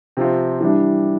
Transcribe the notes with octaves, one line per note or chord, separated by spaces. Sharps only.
C3 F3 C4 F4
E3 G3 D4